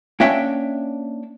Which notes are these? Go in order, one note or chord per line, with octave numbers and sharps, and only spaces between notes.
A#3 C#4 D4 C#5 E5 G5